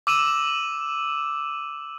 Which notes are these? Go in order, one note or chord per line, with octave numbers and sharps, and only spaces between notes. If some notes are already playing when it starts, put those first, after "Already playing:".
D6 E6 D#7 E7 F#7